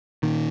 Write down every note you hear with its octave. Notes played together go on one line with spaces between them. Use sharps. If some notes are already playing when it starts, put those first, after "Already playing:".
A#2 D#3